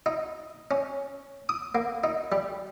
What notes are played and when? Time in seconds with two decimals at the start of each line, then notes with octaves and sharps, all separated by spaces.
0.06 D#4
0.71 C#4
1.49 D#6
1.75 A#3
2.04 D#4
2.32 G3